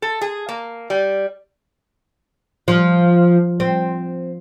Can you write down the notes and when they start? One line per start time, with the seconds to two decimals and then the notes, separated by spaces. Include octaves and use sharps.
0.02 A4
0.21 G#4
0.49 A#3
0.90 G3
2.68 F3
3.60 C4